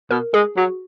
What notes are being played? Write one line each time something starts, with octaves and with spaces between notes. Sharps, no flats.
B2 A#4
G#3 G#4
F#3 F#4